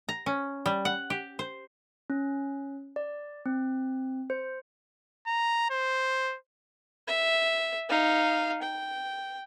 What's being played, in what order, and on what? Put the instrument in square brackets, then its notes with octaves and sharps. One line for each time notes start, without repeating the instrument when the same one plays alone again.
[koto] A#5
C#4
G3
F#5
G4
C5
[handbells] C#4
D5
C4
C5
[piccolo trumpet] A#5
C5
[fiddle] E5
D#4 F5
G5